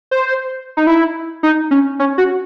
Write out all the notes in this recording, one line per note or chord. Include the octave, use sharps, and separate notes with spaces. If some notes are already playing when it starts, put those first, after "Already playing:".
C5
D#4
E4
D#4
C#4
C#4
F#4